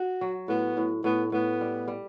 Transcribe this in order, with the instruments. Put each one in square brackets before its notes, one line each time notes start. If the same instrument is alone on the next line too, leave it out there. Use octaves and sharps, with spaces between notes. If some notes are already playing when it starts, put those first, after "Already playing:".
Already playing: [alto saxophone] F#4
[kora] F#3
[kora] A2 [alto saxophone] B3
[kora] A2
[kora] A2 [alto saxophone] B3
[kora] A2 [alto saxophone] B3
[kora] G3
G3